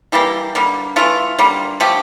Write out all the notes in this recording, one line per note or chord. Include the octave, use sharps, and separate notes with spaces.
E3 G3 A#3 G4
D3 G3 A#3
E3 A3 F4
D3 G3 A#3
D3 F3 A3 G4